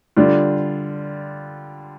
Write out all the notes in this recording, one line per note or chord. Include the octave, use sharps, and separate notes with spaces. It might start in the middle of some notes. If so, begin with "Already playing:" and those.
D3 G3 D4 F4